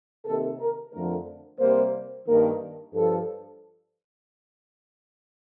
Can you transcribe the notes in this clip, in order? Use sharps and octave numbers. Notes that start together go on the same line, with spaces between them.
C3 D#3 A#3 A4
A#4
F2 D3 F3 A3 A#4
C3 G3 A#3 C5
G2 D#3 A#3 A#4
G2 F3 A4